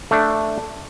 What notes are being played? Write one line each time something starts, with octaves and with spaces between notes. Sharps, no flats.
A3 D4